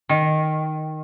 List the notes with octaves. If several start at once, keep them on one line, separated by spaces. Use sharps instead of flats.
D#3